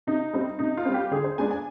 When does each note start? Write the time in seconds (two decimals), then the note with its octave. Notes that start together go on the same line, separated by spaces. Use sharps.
0.07 C3 D#4
0.33 G3 C4
0.59 C3 D#4
0.77 F4
0.85 G3 C4
0.94 G4
1.11 D3 G#4
1.24 C5
1.38 G#3 B3 D4 G#5
1.51 G#5